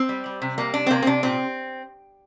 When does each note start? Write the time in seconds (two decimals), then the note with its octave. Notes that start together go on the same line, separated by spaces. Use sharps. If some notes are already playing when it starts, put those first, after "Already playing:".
Already playing: C4
0.09 G3
0.26 G3
0.42 C3
0.58 G3 A#3
0.74 C3 D4
0.86 C4
0.90 C3 A#3
1.02 C4
1.06 C3 D4
1.23 A#2 C4